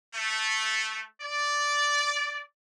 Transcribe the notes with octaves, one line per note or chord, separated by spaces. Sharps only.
A3
D5